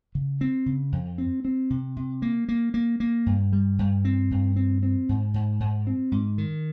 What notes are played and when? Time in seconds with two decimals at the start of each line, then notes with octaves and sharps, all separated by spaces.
0.15 C#3
0.41 C4
0.66 C#3
0.92 F2
1.18 C4
1.45 C4
1.70 C3
1.96 C3
2.22 A#3
2.49 A#3
2.74 A#3
3.00 A#3
3.26 G2
3.53 G3
3.79 G2
4.05 C4
4.31 G2
4.56 C4
4.83 C4
5.09 G#2
5.34 G#2
5.60 G#2
5.87 C4
6.12 G#2
6.38 D#3